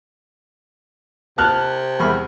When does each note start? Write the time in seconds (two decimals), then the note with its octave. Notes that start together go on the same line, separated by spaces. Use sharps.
1.38 C3 A5 F6 F#6
2.00 E2 B5 F6